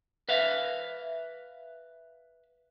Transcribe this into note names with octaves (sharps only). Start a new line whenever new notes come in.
B4 E5 F5